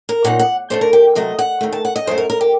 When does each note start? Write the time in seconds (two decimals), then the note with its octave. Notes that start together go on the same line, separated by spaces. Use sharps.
0.09 A#4
0.24 A#2 F#3 C4 D#4 F#5
0.39 F#5
0.70 D3 A3 D4 C5
0.81 A#4
0.93 G4
1.15 C3 F#3 A3 D#5
1.39 F#5
1.61 D#2 D#3 A3
1.72 A5
1.85 F#5
1.96 D#5
2.07 F#2 F#3 A3 C5
2.18 A#4
2.30 A#4
2.41 G4